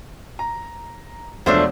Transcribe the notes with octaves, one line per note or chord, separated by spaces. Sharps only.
A#5
E1 F3 A3 D4 C5 C#5